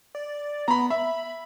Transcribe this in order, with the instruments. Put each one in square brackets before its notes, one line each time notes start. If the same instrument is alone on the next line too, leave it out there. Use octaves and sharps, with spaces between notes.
[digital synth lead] D5
[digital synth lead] B3 [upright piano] A#5 B5
[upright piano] E5 [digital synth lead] B5